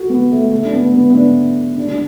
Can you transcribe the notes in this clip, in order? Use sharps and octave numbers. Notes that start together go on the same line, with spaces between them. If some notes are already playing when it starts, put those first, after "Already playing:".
Already playing: F#4 A4
B3
A3
A3
D4
B3
B3
B3
D4
D4
D4